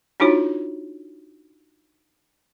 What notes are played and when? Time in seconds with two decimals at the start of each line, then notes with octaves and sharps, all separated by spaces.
0.20 D4 D#4 F4 F#4 C#5